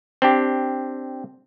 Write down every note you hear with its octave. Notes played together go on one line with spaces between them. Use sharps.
C4 D4 G4